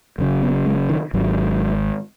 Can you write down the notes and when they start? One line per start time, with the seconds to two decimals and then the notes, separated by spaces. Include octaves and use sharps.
0.18 F#1 F#2 C#3
0.43 B3
0.66 G#3
0.89 D#3
1.14 G#1 G#2 F#3